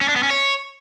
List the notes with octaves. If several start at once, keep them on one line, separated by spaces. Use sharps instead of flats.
C#4
D4
B3
C#4
C#5